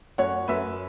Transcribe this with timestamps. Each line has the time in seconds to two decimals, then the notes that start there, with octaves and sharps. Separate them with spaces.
0.18 F#2 C#5 F#5
0.48 F#2 B4 E5